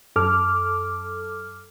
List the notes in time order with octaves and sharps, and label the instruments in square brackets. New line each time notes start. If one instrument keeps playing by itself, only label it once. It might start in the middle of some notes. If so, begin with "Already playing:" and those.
[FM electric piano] F#2 A4 D6 F6